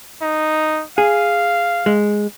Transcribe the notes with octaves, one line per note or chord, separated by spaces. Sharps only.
D#4
G#4 F5
G#3